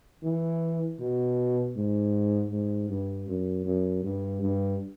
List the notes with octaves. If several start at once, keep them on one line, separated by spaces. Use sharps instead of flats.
E3
B2
G#2
G#2
G2
F#2
F#2
G2
G2